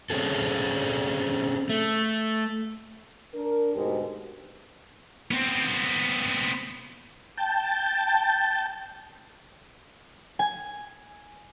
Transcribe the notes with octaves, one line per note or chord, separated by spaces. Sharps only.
C4 C#4 G#4 A4
A3
D4 A#4
D2 G#2 B2 G4 A#4
B3 C4
G5 A5
G#5